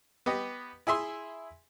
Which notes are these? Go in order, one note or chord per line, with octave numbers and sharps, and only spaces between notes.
B3 G4 D#5
E4 G#4 E5 C6